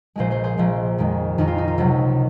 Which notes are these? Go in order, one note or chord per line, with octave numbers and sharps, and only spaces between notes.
A#1 A#2 F3 G#3 G#4 C5
G#4 C5
G#4 C5
A#1 A#2 F3 G#3
F2 D#3 G#3
F2 D#3 G#3 D#4
F4
D#4
F4
C#2 C3 D#3 F#3